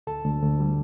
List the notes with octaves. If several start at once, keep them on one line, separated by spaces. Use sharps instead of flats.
D2 A4 A5
D2
D2
G3